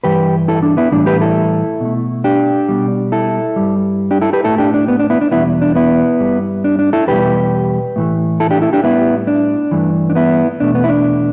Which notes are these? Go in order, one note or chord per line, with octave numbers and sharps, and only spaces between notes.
G2 E3 G3 G4 B4
E4 A4
D4
B3 E4
A2 E3 G3 D4
G4 B4
E4 A4
B2 A3
D4 G4
B2 G3
E4 A4
G2 G3
D4 G4
E4 A4
G4 B4
A2 A3 E4 A4
D4 G4
D4
B3
D4
B3 E4
D4
E2 B2 G3 B3 E4
D4
B3 E4
G2 G3
D4
D4
E4 A4
E2 B2 G3 G4 B4
A2 E3 A3
E4 A4
D4 G4
E4 A4
D4 G4
A2 G3 B3 E4
D4
G2 E3 A3
D4
B3 E4
E2 B2 A3 D4
B3
E4
D4